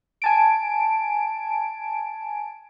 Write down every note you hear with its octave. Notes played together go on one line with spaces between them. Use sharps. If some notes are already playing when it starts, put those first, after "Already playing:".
G#5 A5 D7